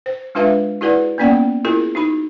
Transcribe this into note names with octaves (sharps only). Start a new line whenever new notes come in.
C5
G#3 D4 F4 B4 E5 F5
E4 F#4 G#4 B4 D5 F#5
A#3 B3 C#4 D5 F#5 G5
E4 F4 G#4 A#4
D#4 F#4 B5